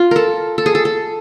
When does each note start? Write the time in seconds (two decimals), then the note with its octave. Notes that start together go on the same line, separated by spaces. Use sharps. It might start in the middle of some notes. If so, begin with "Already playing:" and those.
Already playing: F4
0.11 A4 A#4
0.58 A4
0.66 G#4
0.75 A4
0.85 A4